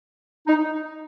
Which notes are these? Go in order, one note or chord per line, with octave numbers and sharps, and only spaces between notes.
D#4